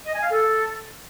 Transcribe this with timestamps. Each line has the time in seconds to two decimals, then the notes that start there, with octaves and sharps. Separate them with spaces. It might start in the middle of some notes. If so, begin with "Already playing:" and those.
0.05 D#5
0.14 G#5
0.22 F5
0.30 A4